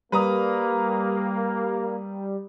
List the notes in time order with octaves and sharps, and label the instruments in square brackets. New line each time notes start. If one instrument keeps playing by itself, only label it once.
[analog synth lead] G3 [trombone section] A#3 [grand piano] B4 A#5 D#6